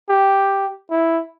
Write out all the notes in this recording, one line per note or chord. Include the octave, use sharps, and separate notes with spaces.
G4
E4